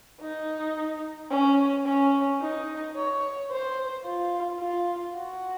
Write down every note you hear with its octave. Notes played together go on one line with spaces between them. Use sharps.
D#4
C#4
C#4
D#4
C#5
C5
F4
F4
F#4